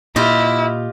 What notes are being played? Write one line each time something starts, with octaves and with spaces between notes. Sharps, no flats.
A#2 E4 F4 G4 D#5